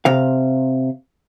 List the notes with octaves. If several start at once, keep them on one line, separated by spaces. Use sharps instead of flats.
C3 F5